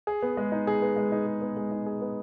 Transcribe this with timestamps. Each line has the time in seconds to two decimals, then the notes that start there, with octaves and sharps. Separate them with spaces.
0.07 G#4
0.23 B3
0.37 G#3
0.52 D#4
0.67 G#4
0.82 B3
0.96 G#3
1.12 D#4
1.27 G#4
1.42 B3
1.57 G#3
1.72 D#4
1.86 G#4
2.01 B3